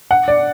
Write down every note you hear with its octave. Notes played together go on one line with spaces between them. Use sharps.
F#5
D5